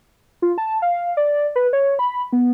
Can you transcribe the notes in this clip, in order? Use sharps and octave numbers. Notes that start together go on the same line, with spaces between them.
F4
A5
F5
D5
B4
C#5
B5
B3